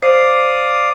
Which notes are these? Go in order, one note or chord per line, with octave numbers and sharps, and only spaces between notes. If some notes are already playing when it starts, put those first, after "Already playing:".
C5 D5 F5 D#6